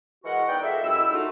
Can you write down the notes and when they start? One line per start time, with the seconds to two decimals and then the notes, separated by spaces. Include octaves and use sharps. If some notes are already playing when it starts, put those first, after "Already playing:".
0.24 E3 G#3 F#4 A#4 D#5 F#5
0.48 B3 D#4 D5 F#5 G5
0.63 G#3 F4 A4 A#4 E5
0.83 F#2 G#3 E4 E5 E6
1.12 A3 D#4 F4 F#4